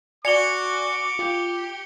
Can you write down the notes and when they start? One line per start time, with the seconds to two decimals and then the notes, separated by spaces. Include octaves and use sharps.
0.25 F#4 D5 G#5 D6 C#7 F7 G7
1.19 F4 G4